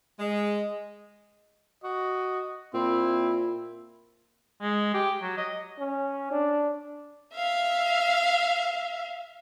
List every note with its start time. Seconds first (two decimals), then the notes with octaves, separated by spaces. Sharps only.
0.19 G#3 D#5
1.84 F#4 D#5
2.74 A#2 C4 E4
4.61 G#3
4.94 G4
5.22 F#3
5.38 D#5
5.79 C#4
6.31 D4
7.35 E5 F5